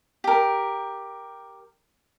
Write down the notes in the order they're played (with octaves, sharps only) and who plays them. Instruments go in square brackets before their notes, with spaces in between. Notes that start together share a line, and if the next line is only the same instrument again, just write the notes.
[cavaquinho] G4 A#4